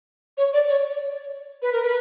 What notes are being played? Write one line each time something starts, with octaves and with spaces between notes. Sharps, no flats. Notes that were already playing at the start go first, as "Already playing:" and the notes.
C#5
D5
C#5
B4
A#4
B4